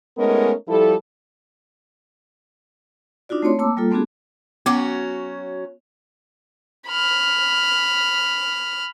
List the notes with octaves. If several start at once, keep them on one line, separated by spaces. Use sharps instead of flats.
G#3 A3 B3 C#4 D#4 A#4
F3 G3 E4 A4
D4 D#4 F4 F#4 D5
A3 C4 C#5 C6
A#3 A5 D6 E6
G3 A#3 F4 A4
A3 B3 C4 D4 F#4 G#4
F#3 B3 C#4 F#4 D6
B5 F6